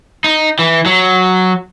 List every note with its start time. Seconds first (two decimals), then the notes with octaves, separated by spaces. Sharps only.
0.24 D#4
0.59 E3
0.86 F#3